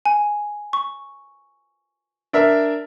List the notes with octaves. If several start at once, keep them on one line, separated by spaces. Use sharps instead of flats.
G#5
C#6
D4 A#4 E5